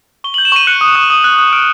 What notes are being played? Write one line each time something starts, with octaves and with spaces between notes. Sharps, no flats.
C#6 G7
F#7
G6
E7
C#6 D#7
F#6 C#7
D#6
D#6
D#6
F#6
F#6
F6 D7